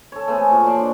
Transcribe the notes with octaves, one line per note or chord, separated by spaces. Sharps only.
A4 C#5
A3 B3 C4 G#4
A#2 F#3 A5
C5 D5 C6 C#6
D4